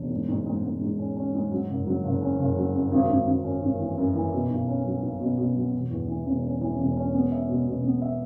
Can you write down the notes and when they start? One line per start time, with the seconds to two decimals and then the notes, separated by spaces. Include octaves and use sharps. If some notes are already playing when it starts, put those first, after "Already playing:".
Already playing: E1
0.10 G#2
0.28 G#2
0.46 G#2
0.64 G#2
0.81 G#2
0.99 C#4
1.16 C#4
1.34 G#2
1.51 F#3
1.70 F#1
1.87 F#3
2.04 F#1
2.22 C#4
2.40 F#1
2.57 F#3
2.74 F#2
2.92 G#1
3.10 G#1
3.27 G#1
3.44 C#4
3.62 G#1
3.79 E3
3.97 F#2
4.15 E3
4.33 B2
4.50 B1
4.68 C#4
4.86 F#3
5.03 B1
5.21 B2
5.38 B2
5.56 F#3
5.73 E1
5.91 E2
6.08 E3
6.26 E1
6.44 C#4
6.61 E3
6.79 E1
6.97 C#4
7.14 B3
7.32 E5
7.49 B2
7.67 B2
7.84 B3
8.01 E5